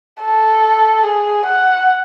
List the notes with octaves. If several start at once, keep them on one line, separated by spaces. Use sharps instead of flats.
A4
G#4
F#5